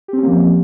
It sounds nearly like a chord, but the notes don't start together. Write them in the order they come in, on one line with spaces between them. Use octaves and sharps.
G4 C4 C#4 A#3 F3